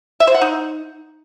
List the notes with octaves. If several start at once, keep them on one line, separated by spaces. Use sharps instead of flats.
E5
C5
F#5
D#4